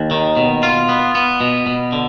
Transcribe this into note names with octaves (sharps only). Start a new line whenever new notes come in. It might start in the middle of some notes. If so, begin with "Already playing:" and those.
Already playing: D#2
D#3
B2
F4
B3
B3
B2
B2
D3